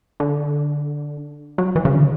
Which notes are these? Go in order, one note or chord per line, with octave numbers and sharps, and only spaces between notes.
D3
F#3
E3
C#3
D3